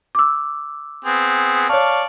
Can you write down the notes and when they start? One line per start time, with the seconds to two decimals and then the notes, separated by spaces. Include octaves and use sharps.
0.15 D6 E6
1.05 B3 C4 G#4
1.69 C#5 D5 F5 A5 C#6